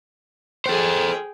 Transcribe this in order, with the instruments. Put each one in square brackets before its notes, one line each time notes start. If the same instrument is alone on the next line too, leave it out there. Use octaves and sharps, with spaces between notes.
[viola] G#4 G5 [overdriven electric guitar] A4 C5